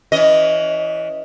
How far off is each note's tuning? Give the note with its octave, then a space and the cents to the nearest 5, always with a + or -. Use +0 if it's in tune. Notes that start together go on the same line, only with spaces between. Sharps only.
E3 +0 C#4 +25 D#5 +0